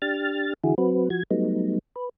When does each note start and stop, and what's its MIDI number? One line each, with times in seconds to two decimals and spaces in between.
0.02 0.53 62
0.02 0.53 67
0.02 0.53 89
0.02 0.53 93
0.64 0.75 50
0.64 0.75 52
0.64 0.75 64
0.64 0.75 66
0.64 0.75 68
0.78 1.09 54
0.78 1.09 60
0.78 1.09 66
0.78 1.09 71
1.10 1.23 53
1.10 1.23 66
1.10 1.23 92
1.31 1.79 54
1.31 1.79 55
1.31 1.79 57
1.31 1.79 59
1.31 1.79 63
1.96 2.09 71